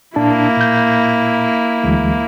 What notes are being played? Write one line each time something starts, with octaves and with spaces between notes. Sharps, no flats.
A#2 A#3 D4 E4 A5
A#2 G6
D2 E3 G#3